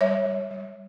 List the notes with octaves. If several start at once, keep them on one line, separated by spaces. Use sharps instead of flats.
G3 C#5 E5
G3
G3